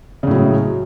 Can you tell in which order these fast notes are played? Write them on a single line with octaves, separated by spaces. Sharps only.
C#3 A2 F#3 G#3